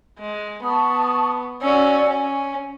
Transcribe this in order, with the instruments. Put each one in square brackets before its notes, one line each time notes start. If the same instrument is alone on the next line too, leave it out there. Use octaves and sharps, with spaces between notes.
[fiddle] G#3
[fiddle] B3 [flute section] A5 C#6 D#6
[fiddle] C#4 F#4 [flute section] D5 G#5 E6
[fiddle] C#4 [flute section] G#5